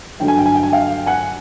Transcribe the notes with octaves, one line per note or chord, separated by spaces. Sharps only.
G2 D3 F#3 A3 G5
G#5
G5
G#5
G5
G#5
F5 G5
F#5 G#5